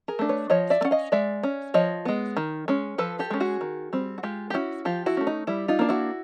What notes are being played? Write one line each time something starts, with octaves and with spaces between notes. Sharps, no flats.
G#4 A#4
A3 D4
B4 C#5
F3 C#5 D#5
D5 E5
A3
C#4 F#5
D#5 F5
G#3 D5 E5
C#4
F3 C#5 D#5
G#3 B3
D#3
G#3 C#4
F3 A4 B4
G4 A4
G#3 C#4
F#4 G#4
D#3
G3 C4
F#4
G#3 F4 G4
G4
C#4 E4 F#4
F3 F4 G4
E4 F#4
A3 C#4
D#4
G3 E4
D#4 F4
A#3 D4
E4 F#4